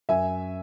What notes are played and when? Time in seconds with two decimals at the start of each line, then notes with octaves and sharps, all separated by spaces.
0.09 F#2 E5 G#5